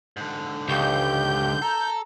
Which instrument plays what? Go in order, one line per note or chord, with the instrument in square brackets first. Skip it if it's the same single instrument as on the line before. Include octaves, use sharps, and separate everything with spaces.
[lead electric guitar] G#2 D3
[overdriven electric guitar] C#2 [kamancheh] G4 [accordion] G6
[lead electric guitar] A4 [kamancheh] A#5